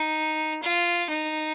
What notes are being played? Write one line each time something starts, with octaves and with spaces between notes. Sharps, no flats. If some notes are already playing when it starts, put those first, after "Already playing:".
Already playing: D#4
F4
D#4